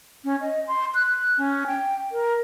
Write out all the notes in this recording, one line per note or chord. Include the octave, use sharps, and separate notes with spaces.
C#4
D#5
C6
F#6
C#4
G5
A#4